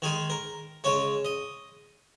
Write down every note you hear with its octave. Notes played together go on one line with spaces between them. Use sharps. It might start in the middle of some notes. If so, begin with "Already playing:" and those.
D#3 G#3 G#4
A#4
C#3 G#3 C#5
D#5